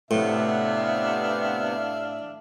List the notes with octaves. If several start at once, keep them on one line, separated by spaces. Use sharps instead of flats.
A2 C3 B3 D4 E5 F5